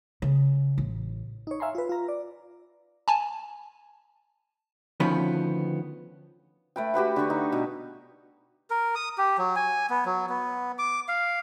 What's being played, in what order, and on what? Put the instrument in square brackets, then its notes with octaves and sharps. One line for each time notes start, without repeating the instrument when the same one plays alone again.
[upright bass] C#3
A1
[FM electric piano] D#4 C#5
E5 F5 G#5 A#5 C6
F4 B4
F4 A#5
D5
[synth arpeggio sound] G#5 A5
[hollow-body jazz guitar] D2 D#3 F3 B3 C#4 B4
[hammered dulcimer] A3 B4 G5
F#4 G4 B4 F#5
D3 C#6
D#4
B2
[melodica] A#4
D#6
G4
F#3
G#5
B3
F#3
B3
D6
F5